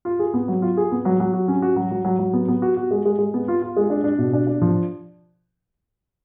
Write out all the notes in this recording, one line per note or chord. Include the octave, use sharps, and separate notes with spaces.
F4
G#4
B3
F#3
F4
G#4
B3
F#3
F#3
F#4
C#4
F#4
F#3
F#3
F#3
F#3
B3
B3
F#4
F#4
G#3
G#3
G#3
B3
F4
F4
G#3
D4
D4
B2
D4
D4
F3